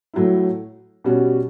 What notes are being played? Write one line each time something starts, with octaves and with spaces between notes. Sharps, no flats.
A2 F#3 A3 E4
B2 G3 C#4 F#4